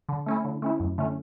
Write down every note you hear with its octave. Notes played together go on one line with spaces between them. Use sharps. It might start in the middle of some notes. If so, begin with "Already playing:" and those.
D3
A3 C#4 E4
D3
A3 C#4 E4
F#2
D3 A3 C#4